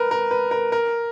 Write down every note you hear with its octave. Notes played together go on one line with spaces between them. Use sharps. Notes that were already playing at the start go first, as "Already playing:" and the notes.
Already playing: A#4 B4
A#4
B4
A#4
A#4